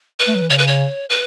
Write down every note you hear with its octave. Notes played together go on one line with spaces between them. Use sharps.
B4
A3
F#3
E3
C#3 C#5
B4
C#5
B4